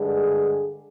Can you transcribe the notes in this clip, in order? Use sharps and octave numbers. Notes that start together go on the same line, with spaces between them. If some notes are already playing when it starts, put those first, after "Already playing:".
Already playing: G2 D3 G#3 G#4